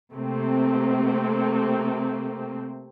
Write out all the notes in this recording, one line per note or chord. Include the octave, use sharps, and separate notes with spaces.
C3 A3 A#3 C4